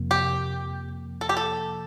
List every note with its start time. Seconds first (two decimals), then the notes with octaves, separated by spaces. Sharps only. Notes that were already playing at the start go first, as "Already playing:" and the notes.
Already playing: F2 C3 F3 A#3
0.11 G4
1.21 A4
1.29 G4
1.37 A4